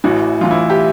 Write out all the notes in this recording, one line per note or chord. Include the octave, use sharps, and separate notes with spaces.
A1 A2 E3 F#4
A1 A2 E3 F4
E4
G4